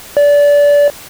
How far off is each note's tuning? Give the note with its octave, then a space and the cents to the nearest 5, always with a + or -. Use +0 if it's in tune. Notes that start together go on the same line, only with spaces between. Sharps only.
D5 -25